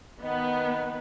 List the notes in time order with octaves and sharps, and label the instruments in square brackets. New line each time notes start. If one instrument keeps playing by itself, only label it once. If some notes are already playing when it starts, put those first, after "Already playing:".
[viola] D#3 B4 [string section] B3 [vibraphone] D#5 F#5